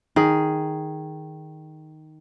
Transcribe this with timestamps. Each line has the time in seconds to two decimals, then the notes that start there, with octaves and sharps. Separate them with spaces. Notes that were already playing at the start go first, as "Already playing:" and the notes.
0.16 D#3 G#4